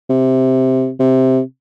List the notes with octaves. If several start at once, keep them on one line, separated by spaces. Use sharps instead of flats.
C3
C3